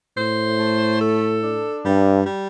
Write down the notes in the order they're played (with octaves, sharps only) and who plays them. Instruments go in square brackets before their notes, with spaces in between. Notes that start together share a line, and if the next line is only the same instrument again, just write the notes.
[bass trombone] A2 [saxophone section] C5
[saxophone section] A3
A4
D4
[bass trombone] G2 [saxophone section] G3
[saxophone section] G3